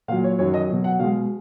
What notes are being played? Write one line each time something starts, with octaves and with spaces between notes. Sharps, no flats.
A#2 F#3 F5
C#5
F#2 D#3 F#3 C#5
D#5
B2 F#3
F#5
B2 G#3 F5